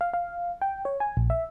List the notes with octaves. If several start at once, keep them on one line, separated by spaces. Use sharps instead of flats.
F5
F5
G5
C#5
G#5
A#1
E5